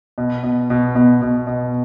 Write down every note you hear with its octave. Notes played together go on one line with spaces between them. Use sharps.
B2
B2
B2
B2
B2
B2